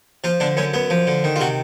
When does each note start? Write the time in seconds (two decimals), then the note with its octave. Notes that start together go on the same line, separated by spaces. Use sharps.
0.24 F3 F4
0.40 D3 D4
0.57 F#2 C#4
0.74 F#2 B3
0.90 F3
1.07 D3
1.24 D#3
1.36 F4
1.40 C3 F#4